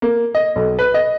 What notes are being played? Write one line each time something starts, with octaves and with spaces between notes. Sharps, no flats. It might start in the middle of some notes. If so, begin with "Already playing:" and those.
A#3
D#5
B1
B4
D#5